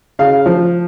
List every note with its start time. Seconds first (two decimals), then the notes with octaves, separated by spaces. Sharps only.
0.19 C#3 F5
0.46 F3